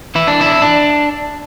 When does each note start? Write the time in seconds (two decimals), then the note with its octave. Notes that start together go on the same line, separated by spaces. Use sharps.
0.15 E3 E4
0.27 D4
0.41 E4
0.46 D4
0.62 D4